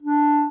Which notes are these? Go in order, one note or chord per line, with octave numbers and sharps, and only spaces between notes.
D4